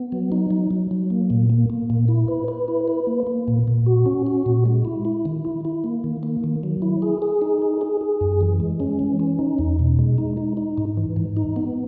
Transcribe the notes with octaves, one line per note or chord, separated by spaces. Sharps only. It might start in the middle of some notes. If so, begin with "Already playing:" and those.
Already playing: B3
F#3
D#4
F#3
F#3
F#3
A#3
A#2
A#3
A#3
A#2
E4
B4
B4
E4
B4
A#3
A#3
A#2
A#2
F#4
C#4
F#4
A#2
G#3
E4
E4
D#3
E4
E4
A#3
D#3
A#3
D#3
F#3
E4
G#4
G#4
D#4
G#4
G#4
G#4
F#2
E3
G#3
C#4
E3
C#4
D#4
E2
B2
G#3
D#4
D#4
D#4
G#2
E3
G#2
D#4
B3